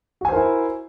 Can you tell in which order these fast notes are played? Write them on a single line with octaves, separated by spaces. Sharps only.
F#4 G#5 C5 A#4 E4